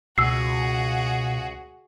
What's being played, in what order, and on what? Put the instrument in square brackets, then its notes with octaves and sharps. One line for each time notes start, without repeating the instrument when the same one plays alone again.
[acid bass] C#2 [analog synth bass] B2 [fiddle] F#4 G#4 [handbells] E6 C7